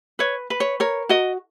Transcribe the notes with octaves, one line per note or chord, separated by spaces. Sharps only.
B4 C#5
B4
C#5
A#4 C#5
F#4 D#5